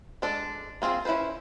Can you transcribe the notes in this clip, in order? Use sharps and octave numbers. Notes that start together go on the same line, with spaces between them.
G#3 D4 A4 D5
A#3 C4 F4 G#4
C#4 E4 F#4 B4 C5